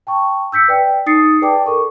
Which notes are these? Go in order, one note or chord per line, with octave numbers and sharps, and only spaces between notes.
G5 A5 C#6
E6 G6 B6 C#7
B4 D5 G5
D#4 D#6 A6 C7 C#7
G#4 B4 D5 G5 A5 D6
A4 A#4 C#6